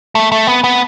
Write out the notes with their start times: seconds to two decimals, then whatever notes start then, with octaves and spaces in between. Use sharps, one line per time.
0.15 A3
0.32 A3
0.47 B3
0.64 B3